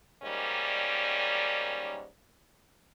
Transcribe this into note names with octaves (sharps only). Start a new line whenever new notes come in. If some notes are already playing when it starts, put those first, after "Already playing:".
G#2 D#3 G3 A#3 C#4 D5